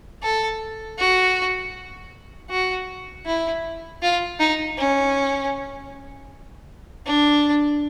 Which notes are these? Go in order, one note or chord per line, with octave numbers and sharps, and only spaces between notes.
A4
F#4
F#4
E4
F4
D#4
C#4
D4